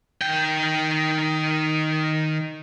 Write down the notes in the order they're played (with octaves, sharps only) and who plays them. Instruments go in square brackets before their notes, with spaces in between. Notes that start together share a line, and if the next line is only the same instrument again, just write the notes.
[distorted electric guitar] D#3 G5